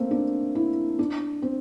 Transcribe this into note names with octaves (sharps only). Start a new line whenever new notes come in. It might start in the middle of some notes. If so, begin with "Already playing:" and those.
Already playing: A3 A#3 C4
D4
E4
D4
C4